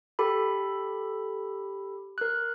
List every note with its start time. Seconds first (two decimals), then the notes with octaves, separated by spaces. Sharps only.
0.19 G4 A4 B5
2.18 A#4 F#6